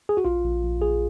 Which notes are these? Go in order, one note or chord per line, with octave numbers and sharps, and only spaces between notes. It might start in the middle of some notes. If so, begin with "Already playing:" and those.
G#4
F#4
A#1 F4
A#1
A#1
A#1 G#4